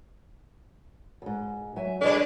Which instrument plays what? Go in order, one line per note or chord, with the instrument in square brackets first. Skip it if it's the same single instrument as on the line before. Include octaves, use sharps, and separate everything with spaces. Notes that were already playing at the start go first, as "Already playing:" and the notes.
[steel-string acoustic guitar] F2 G#2
F#3 E5 G#5
[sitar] C#3 G3 B4 [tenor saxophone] D4 [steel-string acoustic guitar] A4 D5